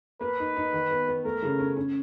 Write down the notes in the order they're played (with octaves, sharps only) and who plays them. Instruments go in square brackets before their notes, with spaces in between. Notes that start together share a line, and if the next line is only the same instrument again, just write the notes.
[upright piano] A#3 [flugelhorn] B4
[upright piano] D#4
D#4
D#3
B3
B3
[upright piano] A3 [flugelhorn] A#4
[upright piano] C#3
C#4
C#4